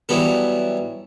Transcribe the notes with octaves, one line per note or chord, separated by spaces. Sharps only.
E3 F#3 G3 B3 A4